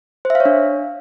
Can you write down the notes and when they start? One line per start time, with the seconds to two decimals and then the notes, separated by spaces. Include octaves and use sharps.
0.25 C5
0.30 E5
0.35 F5
0.40 C#5
0.45 D4